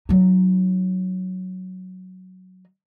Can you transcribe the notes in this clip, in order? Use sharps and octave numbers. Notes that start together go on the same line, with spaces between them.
F#3 D#4